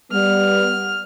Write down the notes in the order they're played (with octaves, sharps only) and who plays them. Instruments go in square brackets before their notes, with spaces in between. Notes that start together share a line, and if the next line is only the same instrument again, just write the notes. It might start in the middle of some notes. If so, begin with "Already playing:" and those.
[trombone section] G3 B3 [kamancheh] F6